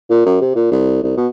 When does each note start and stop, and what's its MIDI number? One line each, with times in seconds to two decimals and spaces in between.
0.10 0.22 46
0.26 0.37 42
0.41 0.51 48
0.56 0.69 46
0.72 1.01 36
1.03 1.17 36
1.17 1.27 47